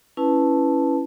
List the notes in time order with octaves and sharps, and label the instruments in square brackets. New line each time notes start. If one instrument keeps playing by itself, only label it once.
[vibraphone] C#4 E4 B4 A5